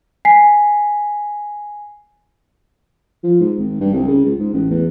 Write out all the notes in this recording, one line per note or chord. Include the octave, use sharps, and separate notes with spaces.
G#5 B6 C7
F3
G#2
G#1
G2
C2
C#3
C#2
G#2
A1
E2